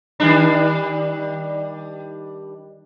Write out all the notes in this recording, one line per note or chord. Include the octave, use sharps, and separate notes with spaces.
D#3 G3 D4